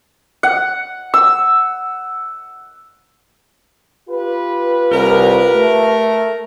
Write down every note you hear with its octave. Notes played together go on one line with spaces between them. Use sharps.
F#5
E6
F4 G4 B4
C2 A#4
A3